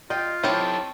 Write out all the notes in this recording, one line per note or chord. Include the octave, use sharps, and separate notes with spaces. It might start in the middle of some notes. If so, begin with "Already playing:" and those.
F4 D#5 G5
C4 D#4 E4 G4 A4 C#5